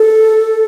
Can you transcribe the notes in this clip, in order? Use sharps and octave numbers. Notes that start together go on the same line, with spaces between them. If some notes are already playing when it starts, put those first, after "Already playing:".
Already playing: A4